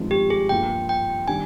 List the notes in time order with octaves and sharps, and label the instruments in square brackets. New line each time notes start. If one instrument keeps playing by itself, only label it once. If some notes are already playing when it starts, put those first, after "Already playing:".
Already playing: [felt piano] G#1 G2 F3 G#3 D#4
[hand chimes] G4
G#4
[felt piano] G2 F3 A#3 F4 [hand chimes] G5
[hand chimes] G5
[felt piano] D#3 G3 D4 [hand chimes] G#5